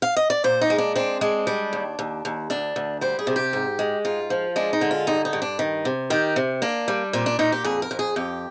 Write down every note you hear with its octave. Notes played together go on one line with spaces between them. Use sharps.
F5
D#5
D5
A#2 C5
D#4
G#3
D4
C4 D4
G#3 D4
G3
D#2
D#2
D#2
D2 D4
D2
G3 C5
G#4
C3
G4
G#2
G#3
G#2 F4
F3
G#3 D4
D#4
D3
F4
G2 D#4
D#4
G2
D4
D#3
C3
D#3 G4
C3
A#3 D4
G3
A#2 C4
D4
A#2 D#4
G4
F2 G#4
A#4
F2
G#4
F2 G4